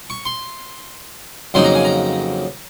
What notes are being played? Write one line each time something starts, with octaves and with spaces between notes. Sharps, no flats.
C#6
C6
F2 C#3 F#3 A#3 D#4 C6
A#5
G#5
A#5